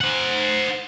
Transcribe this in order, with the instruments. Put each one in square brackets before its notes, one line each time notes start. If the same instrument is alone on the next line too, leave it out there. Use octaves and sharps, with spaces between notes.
[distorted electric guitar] C5 F#5